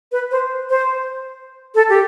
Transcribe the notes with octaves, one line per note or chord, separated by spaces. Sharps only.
B4
C5
C5
A4
G4